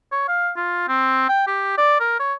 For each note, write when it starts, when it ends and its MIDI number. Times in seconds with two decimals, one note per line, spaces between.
0.12 0.28 73
0.28 0.50 77
0.56 0.84 65
0.88 1.25 60
1.29 1.43 79
1.47 1.75 67
1.78 1.99 74
2.00 2.16 70
2.20 2.34 73